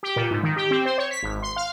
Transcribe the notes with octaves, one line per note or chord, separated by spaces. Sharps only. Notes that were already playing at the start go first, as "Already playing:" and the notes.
G4
A#2
G#2
D#3
G4
C4
C5
C#5
B6
G#1
C6
F5